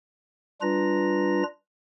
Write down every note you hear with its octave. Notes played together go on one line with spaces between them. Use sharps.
G3 D4 F4 B4 A#5 A#6